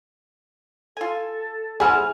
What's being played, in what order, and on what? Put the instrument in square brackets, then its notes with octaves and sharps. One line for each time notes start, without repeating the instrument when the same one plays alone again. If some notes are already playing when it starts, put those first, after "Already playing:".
[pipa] F4 G#5 [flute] A4
[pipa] G3 C4 E4 [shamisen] G#4 F#5 [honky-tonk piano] G#5 F6